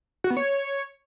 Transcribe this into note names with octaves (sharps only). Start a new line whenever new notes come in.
F#4
B3
C#5